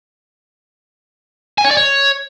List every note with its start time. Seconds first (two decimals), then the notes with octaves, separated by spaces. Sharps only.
1.58 G#5
1.65 C#5
1.71 D5
1.77 C#5